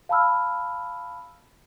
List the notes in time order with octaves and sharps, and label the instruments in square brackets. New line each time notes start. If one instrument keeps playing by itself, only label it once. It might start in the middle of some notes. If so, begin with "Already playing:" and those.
[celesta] F5 A5 B5 E6 F6